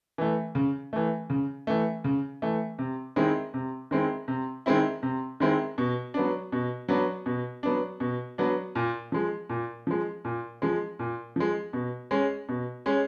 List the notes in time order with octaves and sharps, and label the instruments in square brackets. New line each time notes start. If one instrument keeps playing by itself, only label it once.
[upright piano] E3 A3
C#3
E3 A3
C#3
E3 A3
C#3
E3 A3
C3
D#3 G#3 C4 E4
C3
D#3 G#3 C4 E4
C3
D#3 G#3 C4 E4
C3
D#3 G#3 C4 E4
B2
F#3 B3 D4
B2
F#3 B3 D4
B2
F#3 B3 D4
B2
F#3 B3 D4
A#2
F3 G#3
A#2
F3 G#3
A#2
F3 G#3
A#2
F3 G#3
B2
G#3 C#4
B2
G#3 C#4